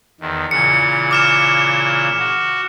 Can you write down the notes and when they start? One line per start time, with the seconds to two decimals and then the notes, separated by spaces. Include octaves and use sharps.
0.21 E2 D#3
0.51 A#2 C#3 E3 C#7
1.11 D6 F6 E7
2.19 F#4